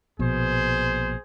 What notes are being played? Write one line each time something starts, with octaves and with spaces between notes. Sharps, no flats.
A#1 B2 G#4 C5